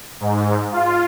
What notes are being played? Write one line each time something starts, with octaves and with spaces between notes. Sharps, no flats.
G#2
F4